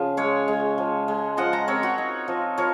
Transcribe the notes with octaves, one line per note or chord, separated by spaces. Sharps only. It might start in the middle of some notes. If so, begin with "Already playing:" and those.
Already playing: C#3 F3
G#3 C#5 F5
G#3
F3
G#3
F3 D#5 F#5
F#5 A#5
C4 A#4 C#5
F#4
D#4
F3
F3 A#4 C#5